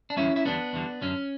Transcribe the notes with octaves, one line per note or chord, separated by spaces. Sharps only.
D4
E2 D3 G3 C#4 E4
E4
E2 D3 G3 B3 D4
E2 D3 G3
F#2 D3 F#3 C#4